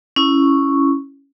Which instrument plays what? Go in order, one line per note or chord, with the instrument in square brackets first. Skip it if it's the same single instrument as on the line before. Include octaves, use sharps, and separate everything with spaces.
[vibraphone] C#4 E4 C#6